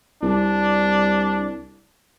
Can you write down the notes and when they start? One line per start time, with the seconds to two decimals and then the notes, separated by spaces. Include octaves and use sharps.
0.23 C2 D4